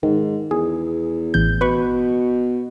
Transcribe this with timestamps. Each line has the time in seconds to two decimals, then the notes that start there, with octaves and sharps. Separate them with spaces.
0.03 G#2 D#3
0.51 E2 G#4
1.34 A1 G6
1.61 B2 B4 B5 C#6